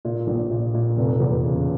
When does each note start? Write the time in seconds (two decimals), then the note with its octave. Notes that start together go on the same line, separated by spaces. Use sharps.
0.05 A#2
0.27 A#1
0.51 A#2
0.74 A#2
0.97 F1
1.20 E2
1.44 C#3